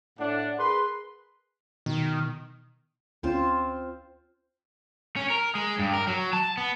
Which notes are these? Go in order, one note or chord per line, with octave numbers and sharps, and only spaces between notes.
A2 D4 F#5
G#4 A#4 B4 C6
B2 D#3
D2 C4 C#4 F4 C5 E7
C#4
A#4
G#3
G2
A#4
F#3
A5
B3